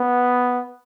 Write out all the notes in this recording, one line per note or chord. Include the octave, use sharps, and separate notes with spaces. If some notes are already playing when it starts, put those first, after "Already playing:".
Already playing: B3